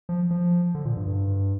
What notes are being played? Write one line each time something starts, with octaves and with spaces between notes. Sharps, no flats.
F3
F3
D3
A#2
G2
G2